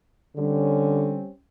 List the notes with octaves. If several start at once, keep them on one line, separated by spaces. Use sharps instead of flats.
D3 G3 C4 C#4